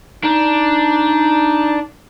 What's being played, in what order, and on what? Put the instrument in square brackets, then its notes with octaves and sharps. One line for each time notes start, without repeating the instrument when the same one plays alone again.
[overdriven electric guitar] D4 [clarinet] D#4